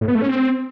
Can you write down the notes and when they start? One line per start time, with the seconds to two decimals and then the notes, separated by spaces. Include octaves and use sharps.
0.01 A2
0.08 B3
0.15 A3
0.22 C#4
0.29 C4